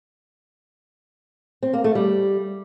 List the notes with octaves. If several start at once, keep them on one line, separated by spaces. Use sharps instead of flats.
C4
A#3
A3
G3